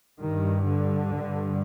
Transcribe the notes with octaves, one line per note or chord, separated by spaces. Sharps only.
G2 D#3
D3
G2